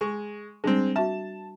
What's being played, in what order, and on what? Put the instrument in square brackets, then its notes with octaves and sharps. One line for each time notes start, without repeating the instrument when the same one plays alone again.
[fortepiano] G#3 C#6
[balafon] G3 D4 [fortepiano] G#3 C4
[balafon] F#4 E5 [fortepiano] A5